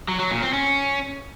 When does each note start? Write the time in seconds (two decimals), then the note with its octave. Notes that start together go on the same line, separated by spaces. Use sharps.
0.08 F#3
0.20 F#3
0.31 A#2
0.42 C4
0.53 C#4